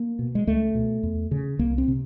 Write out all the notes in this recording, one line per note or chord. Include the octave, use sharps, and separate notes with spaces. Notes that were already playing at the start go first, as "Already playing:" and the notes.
Already playing: A#3
B2
G#3
C#2 A3
B2
E2
C#3
C2 A#3
C4
C3